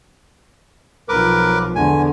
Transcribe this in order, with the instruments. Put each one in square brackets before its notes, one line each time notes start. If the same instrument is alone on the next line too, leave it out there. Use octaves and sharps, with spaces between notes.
[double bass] B1 F3 [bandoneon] A#4 B4 D6
[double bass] E2 D3 [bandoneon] G#5